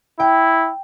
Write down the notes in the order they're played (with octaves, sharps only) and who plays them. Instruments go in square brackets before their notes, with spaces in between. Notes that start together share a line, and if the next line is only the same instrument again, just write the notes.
[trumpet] E4 [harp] G5